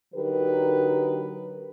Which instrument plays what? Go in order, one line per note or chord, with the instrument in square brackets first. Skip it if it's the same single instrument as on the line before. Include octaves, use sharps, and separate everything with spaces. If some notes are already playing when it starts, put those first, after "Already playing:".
[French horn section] D3 F#3 D#4 G4 A#4 B4